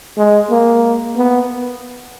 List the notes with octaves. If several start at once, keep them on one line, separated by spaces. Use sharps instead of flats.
G#3
A#3
B3